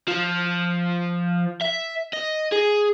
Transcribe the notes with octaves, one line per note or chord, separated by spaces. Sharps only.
F3
E5
D#5
G#4